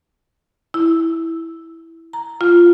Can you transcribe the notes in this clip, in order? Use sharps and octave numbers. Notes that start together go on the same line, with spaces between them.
E4
A#5
F4